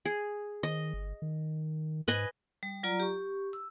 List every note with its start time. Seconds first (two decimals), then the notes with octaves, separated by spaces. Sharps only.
0.05 G#4
0.63 D#3 D#5
0.93 G1
1.22 D#3
2.08 G#2 B4 D#5 G#5
2.63 G3
2.83 F#3 F4 D5 A#5
3.00 G4 C#6
3.53 E6